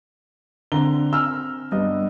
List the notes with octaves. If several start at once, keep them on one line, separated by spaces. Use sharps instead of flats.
D3 C4 A#5 G7
E6 F6
G2 B3 D#5